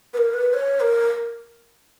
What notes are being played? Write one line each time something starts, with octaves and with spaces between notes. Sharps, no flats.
B4
A#4
B4
C#5
A#4